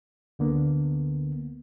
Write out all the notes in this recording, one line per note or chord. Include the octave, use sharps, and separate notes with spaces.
D2 D3 A#3 B3